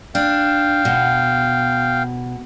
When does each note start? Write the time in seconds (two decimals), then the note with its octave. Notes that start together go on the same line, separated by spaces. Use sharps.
0.15 D4 F5 G5
0.85 B2